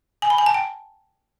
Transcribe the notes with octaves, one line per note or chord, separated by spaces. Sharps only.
G#5
B5
G#5
A5
G5